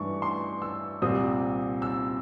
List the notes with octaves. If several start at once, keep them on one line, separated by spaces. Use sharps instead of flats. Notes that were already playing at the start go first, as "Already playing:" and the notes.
Already playing: G2 E3 A3 D4 C#6
C6
E6
C2 A#2 G3 C4 D#6
E6